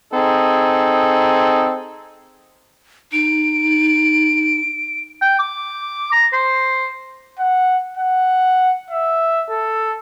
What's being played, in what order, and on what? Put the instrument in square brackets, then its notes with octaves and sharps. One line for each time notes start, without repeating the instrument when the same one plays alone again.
[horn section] C4 D#4 G#4 A4
[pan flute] D#4 [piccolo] D7
[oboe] G5
D6
A#5
C5
[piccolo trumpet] F#5
F#5
E5
A4